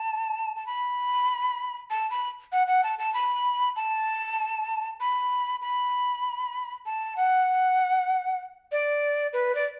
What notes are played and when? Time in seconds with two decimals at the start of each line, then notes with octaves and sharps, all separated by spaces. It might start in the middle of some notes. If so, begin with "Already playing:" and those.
Already playing: A5
0.56 A5
0.66 B5
1.90 A5
2.11 B5
2.52 F#5
2.67 F#5
2.84 A5
2.99 A5
3.14 B5
3.76 A5
5.00 B5
5.62 B5
6.86 A5
7.16 F#5
8.72 D5
9.33 B4
9.55 D5